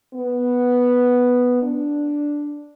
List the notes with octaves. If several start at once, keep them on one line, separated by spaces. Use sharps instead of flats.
B3
D4